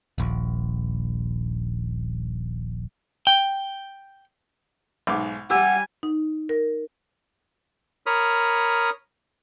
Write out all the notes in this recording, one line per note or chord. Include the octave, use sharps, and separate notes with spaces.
D#1 A#1
G5
B1 G#2 D6
G3 G4 F#5 G#5 E6
D#4
A#4
A#4 C#5 B5 D#6 F6